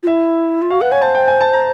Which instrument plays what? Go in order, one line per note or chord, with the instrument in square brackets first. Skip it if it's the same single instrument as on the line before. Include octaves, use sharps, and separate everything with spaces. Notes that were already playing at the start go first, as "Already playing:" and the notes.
[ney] F4
[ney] E4 [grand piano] E5
[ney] F4
[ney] F#4 [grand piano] F5
[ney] B4 [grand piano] F#5
[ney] C#5 [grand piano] G#5
[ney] C5 [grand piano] A5
[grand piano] G5
G#5
A5
A#5